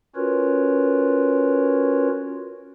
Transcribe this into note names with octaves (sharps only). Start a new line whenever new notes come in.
C#4 F4 F#4 A#4 B4 C#5